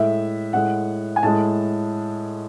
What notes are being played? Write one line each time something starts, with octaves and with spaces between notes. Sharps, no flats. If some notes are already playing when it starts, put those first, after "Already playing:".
Already playing: A2 G#3 E5
A2 G#3 F#5
G#5
A2 G#3 A5